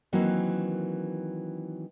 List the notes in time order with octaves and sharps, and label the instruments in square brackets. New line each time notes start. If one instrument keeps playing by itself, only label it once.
[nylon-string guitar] D#3 E3 F#3 A#3 C4